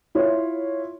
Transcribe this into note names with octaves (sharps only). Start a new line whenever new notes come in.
E4 F4 C#5